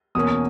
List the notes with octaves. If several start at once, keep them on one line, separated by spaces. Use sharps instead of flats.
E2 B2 A#3 C#4 D#6